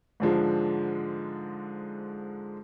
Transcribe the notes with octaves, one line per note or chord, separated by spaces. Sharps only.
G#2 D3 F3 G#3